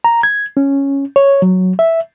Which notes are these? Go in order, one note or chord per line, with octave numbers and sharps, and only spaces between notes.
A#5
G#6
C#4
C#5
F#3
E5